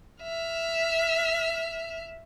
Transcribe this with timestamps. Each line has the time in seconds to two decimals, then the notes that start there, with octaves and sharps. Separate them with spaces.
0.23 E5 F6